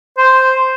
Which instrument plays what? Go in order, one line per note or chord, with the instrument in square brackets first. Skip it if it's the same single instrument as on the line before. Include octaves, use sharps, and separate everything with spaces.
[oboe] C5